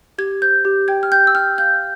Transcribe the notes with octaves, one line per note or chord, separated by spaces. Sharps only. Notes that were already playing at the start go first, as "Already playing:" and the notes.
G4 G#6
C5 G6
G4
G5 G#6
F6
G5 G6
E6
G5 F6
F5 G6